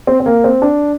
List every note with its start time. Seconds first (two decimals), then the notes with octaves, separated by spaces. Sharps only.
0.07 C4
0.20 C4
0.26 A#3
0.44 C4
0.62 D4